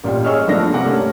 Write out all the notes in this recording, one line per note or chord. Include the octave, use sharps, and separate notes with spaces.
A1 A#2 G3 G5
G#4 C#5 D#5 C#6 E6 F6
G1 D3 F3 A3 D4 A#6
G2 C3 A#3 F#5 D6
G3 A3 C#4